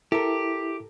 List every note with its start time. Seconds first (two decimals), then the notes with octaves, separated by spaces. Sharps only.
0.12 E4 G4 A4 A#4